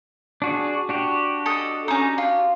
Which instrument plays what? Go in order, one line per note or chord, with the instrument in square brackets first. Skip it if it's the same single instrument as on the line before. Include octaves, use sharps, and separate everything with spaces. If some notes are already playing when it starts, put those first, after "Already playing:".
[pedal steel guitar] D4 F#4 G#4
D4 F#4 G4
[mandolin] A4 D#5
C#4 D#4
F4